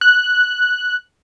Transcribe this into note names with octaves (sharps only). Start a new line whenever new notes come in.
F#6